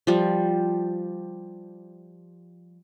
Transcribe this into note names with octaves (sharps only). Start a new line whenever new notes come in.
F3 G3